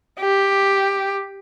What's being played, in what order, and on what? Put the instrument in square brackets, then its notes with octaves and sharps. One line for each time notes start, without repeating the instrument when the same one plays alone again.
[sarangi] G4